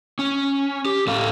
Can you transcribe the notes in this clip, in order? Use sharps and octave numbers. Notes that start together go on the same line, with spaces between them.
C#4
G4
A2 A4 F5